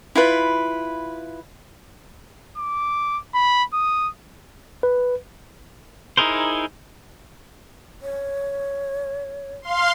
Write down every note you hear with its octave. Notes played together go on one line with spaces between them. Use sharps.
E4 F4 B4
D6
B5
D#6
B4
D#4 E4 G#4 A#4 C5
C#5
F5 C6